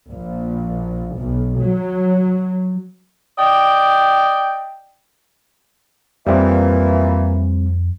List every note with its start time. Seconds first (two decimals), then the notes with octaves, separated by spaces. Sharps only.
0.11 A#1
1.18 B1
1.61 F#3
3.38 D5 D#5 G5
6.27 F2 A#2 E3 G3 C4